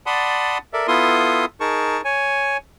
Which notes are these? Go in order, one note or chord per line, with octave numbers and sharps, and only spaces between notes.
D5 F#5 A5 B5 C6 D#6
A4 A#4 D5 E5
B3 E4 F4 A4 C6 D#6
D#4 G#4 A#4 A5 C#6
C#5 G#5